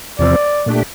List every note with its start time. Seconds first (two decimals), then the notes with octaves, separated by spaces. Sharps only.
0.19 E2 C3 F3 C4 D5
0.66 A#2 A3 D4 G4